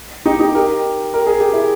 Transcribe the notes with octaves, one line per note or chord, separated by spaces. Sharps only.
D#4 G4
D#4 G4
G4 A#4
A#4
G#4
G4
E4 G#4